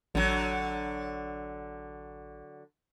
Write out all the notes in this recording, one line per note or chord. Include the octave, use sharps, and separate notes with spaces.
A1 D3 F#3